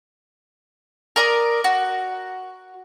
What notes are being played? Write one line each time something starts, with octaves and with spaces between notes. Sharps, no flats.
A#4 D5 D#6
F#4